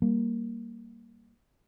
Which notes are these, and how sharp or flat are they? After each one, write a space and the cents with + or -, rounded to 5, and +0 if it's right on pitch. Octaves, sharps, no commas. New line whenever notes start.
G3 +0 A#3 +0